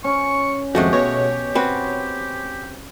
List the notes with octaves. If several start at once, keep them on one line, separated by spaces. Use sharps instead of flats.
C#4 C#6
G#1 F2 G#3 A3 F#4 G4
B2 C#5 A#6
C4 F#4 B4